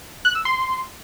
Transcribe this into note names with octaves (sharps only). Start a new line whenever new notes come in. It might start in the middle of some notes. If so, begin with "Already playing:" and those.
F#6
E6
C6